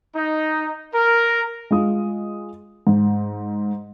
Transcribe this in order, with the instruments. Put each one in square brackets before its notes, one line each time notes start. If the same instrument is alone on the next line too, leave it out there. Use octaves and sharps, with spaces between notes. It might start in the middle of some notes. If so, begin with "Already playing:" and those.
[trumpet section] D#4
A#4
[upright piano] G#3 F4 D#6
G#2